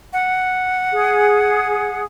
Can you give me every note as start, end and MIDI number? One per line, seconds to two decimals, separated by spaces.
0.13 2.01 78
0.92 2.04 68